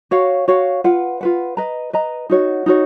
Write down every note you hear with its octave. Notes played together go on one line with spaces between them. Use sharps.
F#4 C#5 F5
F#4 C#5 F5
F4 B4 F#5
F4 B4 F#5
B4 D#5 A#5
B4 D#5 A#5
D#4 F#4 C#5
D#4 F#4 C#5